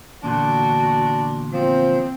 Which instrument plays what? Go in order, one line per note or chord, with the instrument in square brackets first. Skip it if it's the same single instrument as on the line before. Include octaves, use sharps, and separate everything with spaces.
[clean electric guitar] E2 A#2 D3 [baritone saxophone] D4 [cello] F#4
[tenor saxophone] F3 [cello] C4